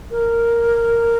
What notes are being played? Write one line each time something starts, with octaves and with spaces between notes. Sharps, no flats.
A#4